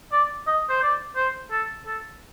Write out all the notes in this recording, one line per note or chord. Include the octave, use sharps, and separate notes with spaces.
D5
D#5
C5
D5
C5
A4
A4